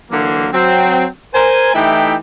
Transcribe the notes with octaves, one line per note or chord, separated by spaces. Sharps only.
D3 E3 F#3 A#3
F#3 C4
A#4 C5 G#5
E3 A3 D#4 E4 G4 G5